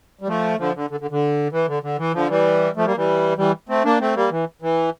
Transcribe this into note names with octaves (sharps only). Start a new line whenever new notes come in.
G3
F3 A3
D3 F3
D3
D3
D3
D3
E3
D3
D3
E3
D3 F3
E3 G3
F3 A3
G3 A#3
E3 G3
E3 G3
A3 C4
A#3 D4
A3 C4
G3 A#3
E3
E3